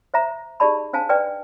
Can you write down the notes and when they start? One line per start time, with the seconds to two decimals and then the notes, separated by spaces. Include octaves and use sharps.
0.14 C5 E5 A#5
0.60 D#4 G4 G#4 D5 A5 B5
0.93 D4 C5 F5 G#5 A5
1.09 B4 D5 G5